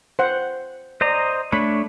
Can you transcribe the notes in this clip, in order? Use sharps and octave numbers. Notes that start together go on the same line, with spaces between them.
C5 F#5
C5 D5 D#5 A#5
A3 D4 C#5 B5